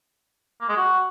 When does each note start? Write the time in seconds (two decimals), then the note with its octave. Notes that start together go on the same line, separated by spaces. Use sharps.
0.61 A#3
0.69 G#3
0.77 F#4